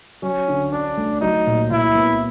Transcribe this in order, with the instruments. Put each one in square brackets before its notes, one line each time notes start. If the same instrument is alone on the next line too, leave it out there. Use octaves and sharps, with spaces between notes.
[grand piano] F#3 [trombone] C#4
[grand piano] D3
[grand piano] C#4 [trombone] D4
[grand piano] A3
[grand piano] F#3 [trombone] D#4
[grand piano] A#2
[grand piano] A#2 [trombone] E4
[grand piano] B3